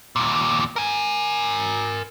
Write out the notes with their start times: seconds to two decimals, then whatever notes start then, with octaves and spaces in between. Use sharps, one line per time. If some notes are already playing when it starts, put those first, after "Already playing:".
0.16 D#2 A#2
0.76 A#4 G#5